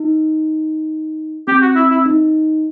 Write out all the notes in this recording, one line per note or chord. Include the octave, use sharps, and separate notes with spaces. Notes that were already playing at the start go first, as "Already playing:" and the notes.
Already playing: D#4
C4 G4
F#4
E4
E4
D#4